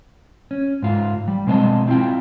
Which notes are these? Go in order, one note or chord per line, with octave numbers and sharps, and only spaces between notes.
C#4
G#2 F4
G3
B2 G#3 C4 C#5 D#5 A5
C4 E4 F4 G5